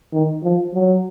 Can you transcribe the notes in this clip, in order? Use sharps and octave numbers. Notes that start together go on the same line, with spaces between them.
D#3
F3
F#3